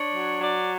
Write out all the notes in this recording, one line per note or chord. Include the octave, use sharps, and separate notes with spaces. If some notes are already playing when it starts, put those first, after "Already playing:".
Already playing: D4 C#5
F#3
F#3 D5